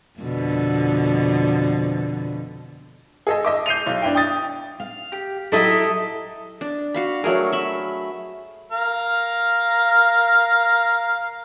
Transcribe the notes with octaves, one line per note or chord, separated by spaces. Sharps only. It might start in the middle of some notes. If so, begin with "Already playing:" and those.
F2 B2 D3
G#4 A4 D#5
D#5 E5 D6
G6 C7 D#7 F7
B1
D4 E4 G5
G5 D#6 A6
F5
G4
F#3 E4 G4 A4 D#5 E5
D4
F#4 F5 B5
F#3 A3 G#4 A#4
E5 B5
A#4 F5